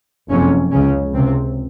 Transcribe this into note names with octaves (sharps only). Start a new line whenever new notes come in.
F#1 F2 C3 C#4
C#2 C#3 C#4
C#2 C3 C4